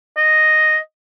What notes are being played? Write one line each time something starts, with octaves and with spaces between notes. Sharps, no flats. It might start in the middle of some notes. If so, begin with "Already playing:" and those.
D#5